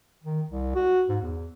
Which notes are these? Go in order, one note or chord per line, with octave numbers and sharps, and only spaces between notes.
D#3
C2
F#4
G#2
E2